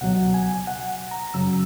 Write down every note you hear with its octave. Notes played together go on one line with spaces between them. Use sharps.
C#2 B2 F#3 F#5
G#5
F#5
A#5
F#2 C#3 F#3 E6